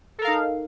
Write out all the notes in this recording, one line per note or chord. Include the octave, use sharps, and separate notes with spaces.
D#4 A4 A#4 F5